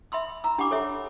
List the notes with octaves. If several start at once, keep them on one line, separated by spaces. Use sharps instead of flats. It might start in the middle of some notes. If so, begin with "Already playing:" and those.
E5 B5 C6 E6
A#5 E6
D4 G4 F#5 B5 D6
A4 C#5 E5